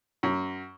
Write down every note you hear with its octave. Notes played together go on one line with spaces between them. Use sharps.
F#2